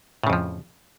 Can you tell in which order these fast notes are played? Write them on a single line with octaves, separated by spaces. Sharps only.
A2 C#3 F2 F3